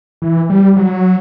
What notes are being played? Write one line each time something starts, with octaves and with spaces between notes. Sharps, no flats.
E3
G3
F#3